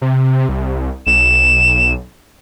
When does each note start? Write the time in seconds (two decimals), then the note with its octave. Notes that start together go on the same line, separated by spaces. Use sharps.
0.02 C3
0.49 C2
1.07 B1 E7